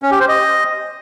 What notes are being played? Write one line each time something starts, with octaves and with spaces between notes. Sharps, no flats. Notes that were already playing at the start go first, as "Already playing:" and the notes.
C#4
G4
C5
D#5